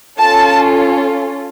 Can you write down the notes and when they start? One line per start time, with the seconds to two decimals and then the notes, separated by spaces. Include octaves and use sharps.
0.19 C#4 F4 A4 A5